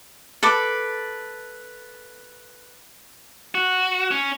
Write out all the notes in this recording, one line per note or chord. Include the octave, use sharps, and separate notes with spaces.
A4 B4 D6
F#4
C#4